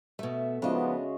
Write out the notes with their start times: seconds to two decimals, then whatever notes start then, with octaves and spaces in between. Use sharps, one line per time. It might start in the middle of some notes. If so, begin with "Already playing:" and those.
0.19 B2 A3 E5
0.62 C#3 F3 G#3 B3 D4 D#4 F#4 D#5